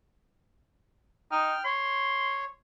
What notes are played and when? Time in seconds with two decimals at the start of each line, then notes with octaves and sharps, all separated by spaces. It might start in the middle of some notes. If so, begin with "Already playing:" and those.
1.32 D#4 G5 F6
1.65 C#5 C6